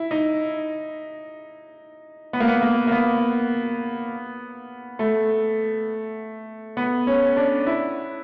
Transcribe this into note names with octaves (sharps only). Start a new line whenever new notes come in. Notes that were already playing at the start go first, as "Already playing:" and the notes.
Already playing: E4
D#4
B3
A#3
B3
A#3
A#3
B3
A3
B3
C#4
D4
E4